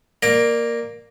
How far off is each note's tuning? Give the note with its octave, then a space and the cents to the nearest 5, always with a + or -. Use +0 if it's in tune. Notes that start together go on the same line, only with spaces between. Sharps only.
A#3 +0 D5 +20 A#5 +0